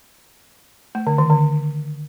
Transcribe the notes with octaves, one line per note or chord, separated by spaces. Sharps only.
A3
D3
D#3
D3